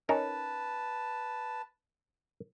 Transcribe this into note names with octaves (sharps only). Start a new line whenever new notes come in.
C#4 D#4 A#4 B4 A5